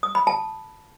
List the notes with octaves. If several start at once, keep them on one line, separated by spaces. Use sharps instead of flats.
D#6
B5
A5